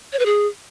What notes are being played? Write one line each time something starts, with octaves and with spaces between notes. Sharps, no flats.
C#5
B4
G#4